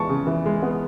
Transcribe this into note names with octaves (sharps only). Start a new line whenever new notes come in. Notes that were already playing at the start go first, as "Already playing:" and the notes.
Already playing: E3 G#3 B3 A5 C#6
C#3
E3
G#3
B3